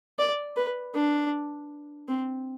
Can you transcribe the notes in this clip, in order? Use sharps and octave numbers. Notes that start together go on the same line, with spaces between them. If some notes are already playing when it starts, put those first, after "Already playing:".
D5
B4
D4
C4